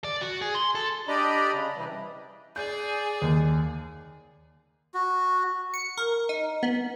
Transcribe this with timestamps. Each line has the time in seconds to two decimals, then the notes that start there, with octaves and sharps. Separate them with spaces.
0.04 D5
0.21 F#4
0.42 G#4
0.55 C6
0.75 A4
1.08 D4 G4 D5 D#5 A#5 B5
1.53 C#3
1.76 C3 E3 G3
2.56 G#4 D5 G6
3.22 D#2
4.94 F#4
5.74 C#7
5.97 A#4
6.29 D#4
6.63 B3